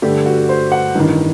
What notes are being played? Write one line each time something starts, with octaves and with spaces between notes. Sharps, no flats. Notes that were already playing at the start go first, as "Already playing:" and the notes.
G2 D3 A3 D4 G4
F#4
C5
F#5
A1 G2 D#3